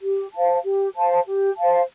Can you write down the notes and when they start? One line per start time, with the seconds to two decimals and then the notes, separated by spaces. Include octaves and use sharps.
0.02 G4
0.33 C5 F5 A5
0.63 G4
0.95 C5 F5 A5
1.26 G4
1.56 C5 F5 A5